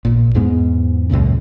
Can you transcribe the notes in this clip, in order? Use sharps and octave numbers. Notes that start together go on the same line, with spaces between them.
A#1 A#2
E2 G#2 G#3 B3
C#2 F#2 A#2 C#3